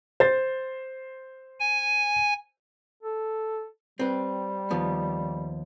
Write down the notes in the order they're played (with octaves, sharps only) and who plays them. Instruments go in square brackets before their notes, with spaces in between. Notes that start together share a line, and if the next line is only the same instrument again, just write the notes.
[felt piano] C5 A6
[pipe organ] G#5
[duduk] A4
[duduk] G3 [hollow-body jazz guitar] C4 B4
[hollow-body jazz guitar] D#2 F3 B3